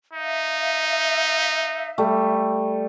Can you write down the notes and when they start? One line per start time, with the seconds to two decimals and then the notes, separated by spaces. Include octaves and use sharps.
0.13 D#4 E5 F5
1.98 G3 A3